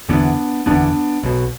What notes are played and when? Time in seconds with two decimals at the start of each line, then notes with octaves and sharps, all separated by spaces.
0.09 F#1 E2 D3 B3 D4
0.66 F#1 E2 D3 B3 D4
1.23 B1 B2